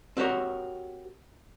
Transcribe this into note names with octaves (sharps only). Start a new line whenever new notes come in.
C4 F#4 G4 A#4 C#5